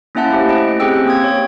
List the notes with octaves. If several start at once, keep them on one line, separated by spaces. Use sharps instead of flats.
A#3 C#4 E4 E5 F#5 A5
A3 E4 G4 C5
D#5 D7
C4 C#4 G4 G#4 G5 E6
A#3 D#6 G#6
C#5